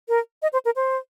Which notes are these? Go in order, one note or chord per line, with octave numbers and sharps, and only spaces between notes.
A#4
D#5
C5
A#4
C5